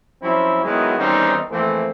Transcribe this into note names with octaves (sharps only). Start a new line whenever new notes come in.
F3 F#3 C4 C#4 E4
D#3 F#3 G#3 B3 E4 F#4
E2 D#3 G3 C4 C#4 D#4
F2 E3 A3 A#3 C4